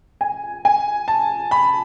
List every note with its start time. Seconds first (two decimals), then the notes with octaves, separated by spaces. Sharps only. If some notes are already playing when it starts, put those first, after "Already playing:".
0.21 G#5
0.65 G#5
1.08 A5
1.51 B5